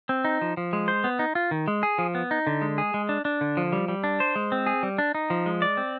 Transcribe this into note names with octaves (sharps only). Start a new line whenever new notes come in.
C4
D#4
F3
F3
G#3
C5
B3
D#4
F4
D#3
G#3
G#4
F3
B3
D#4
D3
G#3
G#4
G#3
D4
D4
D3
F3
G3
G3
D4
C5
G#3
C4
G#4
G3
D4
D#4
F3
G#3
D5
C4